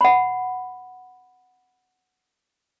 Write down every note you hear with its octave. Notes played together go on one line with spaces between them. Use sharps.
F#5 B5